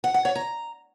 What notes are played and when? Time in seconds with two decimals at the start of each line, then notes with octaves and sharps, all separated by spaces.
0.04 F#5
0.14 F#5
0.25 C#5
0.35 A#5